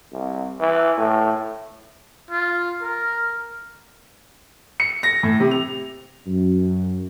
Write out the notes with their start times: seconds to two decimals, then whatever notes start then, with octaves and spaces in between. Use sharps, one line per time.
0.12 C2
0.60 E3
0.97 A2
2.30 F4
2.82 A#4
4.80 C#7
5.03 A#6
5.23 A2
5.40 C3
5.51 F7
6.27 F#2